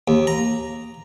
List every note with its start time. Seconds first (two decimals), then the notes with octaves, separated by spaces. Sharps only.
0.08 D#2
0.27 A#5